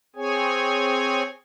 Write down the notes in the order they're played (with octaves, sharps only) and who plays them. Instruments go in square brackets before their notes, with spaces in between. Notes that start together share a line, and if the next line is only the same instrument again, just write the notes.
[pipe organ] C4 G#4 C#5 G#5